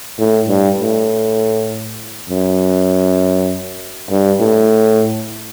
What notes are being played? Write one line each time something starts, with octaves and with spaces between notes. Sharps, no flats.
A2
G2
A2
F#2
G2
A2